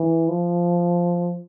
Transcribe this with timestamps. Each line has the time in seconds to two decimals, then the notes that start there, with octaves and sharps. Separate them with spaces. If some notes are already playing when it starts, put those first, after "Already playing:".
Already playing: E3
0.29 F3